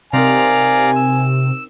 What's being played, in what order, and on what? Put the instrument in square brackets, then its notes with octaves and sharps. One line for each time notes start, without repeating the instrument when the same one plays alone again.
[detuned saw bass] C3 [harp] C4 D#4 A#4 [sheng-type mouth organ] D5 F5 A#5 [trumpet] G#5
[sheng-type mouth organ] E6